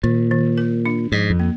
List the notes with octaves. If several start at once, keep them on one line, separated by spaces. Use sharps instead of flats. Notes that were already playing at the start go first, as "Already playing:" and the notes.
A#2 D#3
D#3
A#4
D4
G#2 F3
F2
A#3